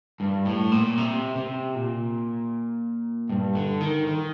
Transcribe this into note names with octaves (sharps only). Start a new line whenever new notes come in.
G2
A2
A#2
C3
C3
A#2
G2
D3
D#3
D#3